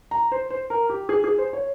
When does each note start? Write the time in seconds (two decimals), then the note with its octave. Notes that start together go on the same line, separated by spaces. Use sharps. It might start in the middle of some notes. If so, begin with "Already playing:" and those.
0.11 A#5
0.32 C5
0.50 C5
0.70 A#4
0.89 G4
1.09 G#4
1.24 G#4
1.38 C5
1.53 C#5